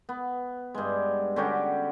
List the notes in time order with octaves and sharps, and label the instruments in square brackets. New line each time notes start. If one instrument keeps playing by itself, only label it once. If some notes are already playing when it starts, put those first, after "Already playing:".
[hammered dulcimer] B3
G2 G#3
D3 C#4 F#4 G4